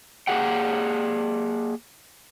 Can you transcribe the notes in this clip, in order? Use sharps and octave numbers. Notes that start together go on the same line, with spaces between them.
A#3 G4 G#4 F#5 G5